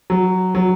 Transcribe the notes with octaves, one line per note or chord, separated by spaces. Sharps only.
F#3
F#3